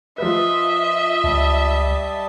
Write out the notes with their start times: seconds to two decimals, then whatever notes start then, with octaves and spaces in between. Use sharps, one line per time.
0.18 F3 B4 D#5 E5
1.24 C#2 G3 A5